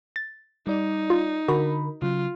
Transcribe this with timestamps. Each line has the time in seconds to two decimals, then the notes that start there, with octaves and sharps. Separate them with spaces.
0.16 A6
0.67 G3 D#4 D5
1.10 F4
1.48 D3 F#4 A#4 B5
2.02 C#3 F#3 F4